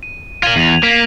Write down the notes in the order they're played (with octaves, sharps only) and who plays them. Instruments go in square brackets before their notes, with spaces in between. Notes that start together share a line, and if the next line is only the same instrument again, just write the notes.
[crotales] D#7
[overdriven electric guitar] F4 A#4 [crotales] G#6 D#7 F#7
[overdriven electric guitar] E2 [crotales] D#7 F7
[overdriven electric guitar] A#3 [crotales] B6